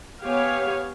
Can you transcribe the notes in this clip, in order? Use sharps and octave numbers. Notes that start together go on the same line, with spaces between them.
B3 G4 C#5 F5 G#5